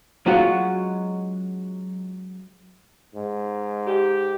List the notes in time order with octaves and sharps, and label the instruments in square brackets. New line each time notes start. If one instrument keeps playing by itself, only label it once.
[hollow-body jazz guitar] F#3 G#3 C#4 F4 F#4
[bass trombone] G#2
[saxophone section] G4